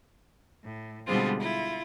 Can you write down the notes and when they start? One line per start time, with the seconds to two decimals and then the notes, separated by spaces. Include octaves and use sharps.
0.62 A2
1.06 B2 D3 G3 G#3 C4 F4
1.39 E4 F4